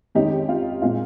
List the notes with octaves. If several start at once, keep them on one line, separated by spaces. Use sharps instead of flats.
F2 D#3 G#3 C#4 D#4 G4
F4
A#2 G#3 C4 F4